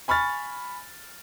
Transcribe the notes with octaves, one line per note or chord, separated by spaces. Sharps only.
G#5 B5 C#6 F6 A6